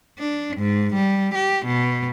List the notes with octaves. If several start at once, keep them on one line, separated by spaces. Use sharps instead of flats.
D4
G#2
G3
G4
B2